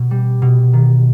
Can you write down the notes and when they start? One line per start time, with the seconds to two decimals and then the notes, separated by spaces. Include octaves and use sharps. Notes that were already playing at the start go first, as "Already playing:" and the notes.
Already playing: B2
0.11 G3
0.42 B2
0.73 D#3